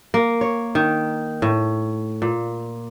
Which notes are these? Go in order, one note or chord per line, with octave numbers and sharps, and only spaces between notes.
A#3
C#5
D#3
A2
A#2